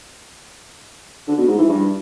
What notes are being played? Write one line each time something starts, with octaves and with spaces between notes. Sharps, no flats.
D3
B2
G#2
E3
G2